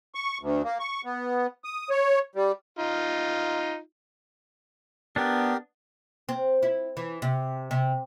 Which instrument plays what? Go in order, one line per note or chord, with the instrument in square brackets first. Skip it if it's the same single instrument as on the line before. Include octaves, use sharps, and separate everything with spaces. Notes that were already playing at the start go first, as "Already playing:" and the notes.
[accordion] C#6
D2
A#3
C#6
B3
D#6
C#5
G3
[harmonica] D#4 F4
[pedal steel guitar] B3 D4 [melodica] G4 A#4 G5
[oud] C4
E4
E3
C3
C3